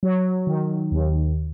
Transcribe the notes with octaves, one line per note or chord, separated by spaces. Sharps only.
F#3
D#3
D#2